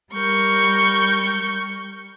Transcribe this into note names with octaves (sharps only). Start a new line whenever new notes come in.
G3 A#4 C#6 G6